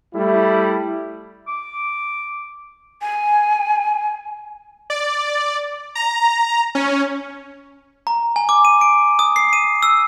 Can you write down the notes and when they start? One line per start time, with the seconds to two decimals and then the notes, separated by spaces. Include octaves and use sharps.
0.14 G3 A3 E4
1.48 D6
3.02 G#5
4.90 D5
5.95 A#5
6.75 C#4
8.07 A#5
8.36 G#5
8.49 D6
8.65 D#7
8.81 D7
9.19 D#6
9.36 C7
9.53 D#7
9.83 E6